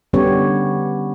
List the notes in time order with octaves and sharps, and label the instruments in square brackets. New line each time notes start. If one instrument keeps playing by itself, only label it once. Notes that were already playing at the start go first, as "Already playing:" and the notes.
[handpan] D3 G3 B3 C#4 G4 C#5